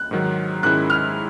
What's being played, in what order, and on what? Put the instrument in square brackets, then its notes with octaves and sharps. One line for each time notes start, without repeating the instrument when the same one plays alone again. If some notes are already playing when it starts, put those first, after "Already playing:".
Already playing: [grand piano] F#6
[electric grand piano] G#2 D#3 F#3
[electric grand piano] G#2 D#3 G#3 C#4 E4 [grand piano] F#6
[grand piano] F6